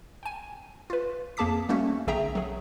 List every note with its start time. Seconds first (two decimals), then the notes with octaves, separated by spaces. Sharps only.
0.23 G5 G#5
0.90 F4 B4
1.37 F2 A#3 G#4 A5 D6 B6
1.69 G3 A3 A#3 C#4 F#4
2.07 B1 D3 G#4 E5 G5 A#5
2.35 F#3 G#4